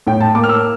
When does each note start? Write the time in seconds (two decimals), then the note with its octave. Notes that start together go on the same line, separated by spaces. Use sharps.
0.07 A2 G5
0.21 A5
0.35 A#3 D6
0.44 F6
0.49 E6